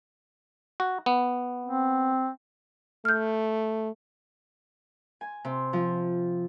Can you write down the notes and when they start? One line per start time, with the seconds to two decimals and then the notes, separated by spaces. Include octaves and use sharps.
0.80 F#4
1.06 B3
1.66 C4
3.05 A3 F6 G6
5.21 G#5
5.45 C3
5.73 F3